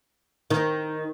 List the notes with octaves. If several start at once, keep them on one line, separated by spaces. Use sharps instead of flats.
D#3